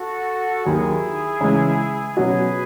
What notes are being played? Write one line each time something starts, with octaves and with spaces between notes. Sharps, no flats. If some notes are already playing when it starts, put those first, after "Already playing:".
Already playing: F#4 A4
D#2 D#3 F#3 E4 G#4
C#3 E3 G#3
B2 F#3 C#4 F#4 G#4 B4